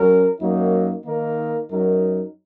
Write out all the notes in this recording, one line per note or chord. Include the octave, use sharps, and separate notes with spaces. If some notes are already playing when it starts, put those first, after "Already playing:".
Already playing: F#2 F#3 C#4 A#4
F#2 F#3 A#3 D#4
D#3 A#3 D#4 A#4
F#2 F#3 D#4 A#4